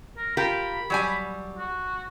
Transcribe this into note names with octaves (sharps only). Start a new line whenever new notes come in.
A#4
F4 G4 A#4 B5
F#3 G3 G#5
F#4